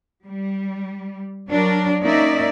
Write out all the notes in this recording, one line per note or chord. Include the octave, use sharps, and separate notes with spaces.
G3
F#3 D4 A#4
A#3 C#4 D#4 D5 E5